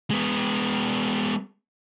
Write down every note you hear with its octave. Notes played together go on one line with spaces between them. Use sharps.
G#3 B3